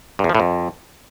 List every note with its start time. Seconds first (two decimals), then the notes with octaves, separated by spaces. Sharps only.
0.19 G2
0.24 E2
0.29 F3
0.35 A2
0.40 F2